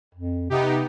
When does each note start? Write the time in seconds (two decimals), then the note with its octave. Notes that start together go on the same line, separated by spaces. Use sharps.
0.14 F2
0.50 C3 B3 D#4 G4